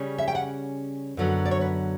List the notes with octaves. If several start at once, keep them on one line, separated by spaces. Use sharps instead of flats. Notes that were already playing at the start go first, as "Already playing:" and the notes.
Already playing: C#3 G3 C#4
E5
G5
F#5
F#2 D3 F#3 B3
D5
C#5
B4